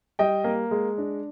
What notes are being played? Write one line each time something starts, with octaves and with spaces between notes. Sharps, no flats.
G3 D#5 G5
A#3
G#3
D4